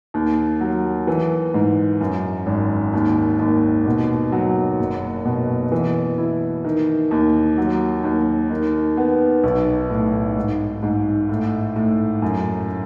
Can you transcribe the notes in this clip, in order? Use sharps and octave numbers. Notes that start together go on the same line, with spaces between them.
D#2
F#3
E3
G#2
F#2
G#1
D#2
D#2
B2
F#3
F#1
B2
E3
E4
D#3
D#2
F#3
D#2
D#3
B3
B1
A2
G#2
G#2
A2
A2
F#2